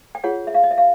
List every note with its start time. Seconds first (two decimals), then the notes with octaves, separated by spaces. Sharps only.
0.15 G5
0.24 F4 G#4 C#5 F#5
0.47 E5
0.54 F5
0.63 D#5
0.71 E5
0.78 F5